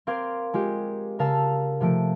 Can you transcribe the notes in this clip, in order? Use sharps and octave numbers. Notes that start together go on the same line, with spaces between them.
C4 A#4 F5 C6 D6 G#6
G#3 F4 G4
C#3 A#4 F5 A5 E6
C3 F3 A3 D7